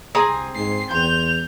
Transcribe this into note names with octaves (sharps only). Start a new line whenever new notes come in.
C2 C4 G#4 G#5 A#5 D#6
G#2 C7
E2 C6 G6 F7